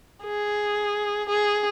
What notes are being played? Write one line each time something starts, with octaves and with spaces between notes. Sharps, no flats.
G#4
G#4